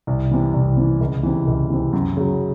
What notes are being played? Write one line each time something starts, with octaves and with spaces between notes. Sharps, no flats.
C2
C3 E3
C2
C3 E3
C#2
C3 E3
C#2
C3 E3
F#2
C#3 F#3